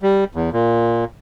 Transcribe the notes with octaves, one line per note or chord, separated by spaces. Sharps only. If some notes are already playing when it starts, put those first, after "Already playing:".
G3
E2
A#2